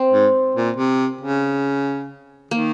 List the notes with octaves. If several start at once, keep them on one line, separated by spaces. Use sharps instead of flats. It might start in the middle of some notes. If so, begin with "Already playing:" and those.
Already playing: C4
G#2
A#2
C3
C#3
D#3 A#3